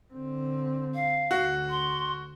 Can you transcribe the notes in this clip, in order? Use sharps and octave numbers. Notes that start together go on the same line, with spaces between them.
D3 C4
F5
D2 F#4
C6